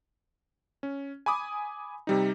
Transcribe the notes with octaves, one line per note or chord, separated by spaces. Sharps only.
C#4
G#5 B5 D6 D#6
C3 G3 D#4